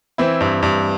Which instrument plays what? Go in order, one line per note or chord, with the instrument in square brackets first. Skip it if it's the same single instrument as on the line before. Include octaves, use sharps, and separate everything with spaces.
[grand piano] E3 C4 E4
G2
G2